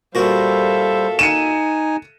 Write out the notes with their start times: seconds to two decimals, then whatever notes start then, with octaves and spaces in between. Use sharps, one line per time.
0.15 A#2 G3 F#4 A4 C5 E5 F5
1.19 D#4 G#5 C#7 D#7 E7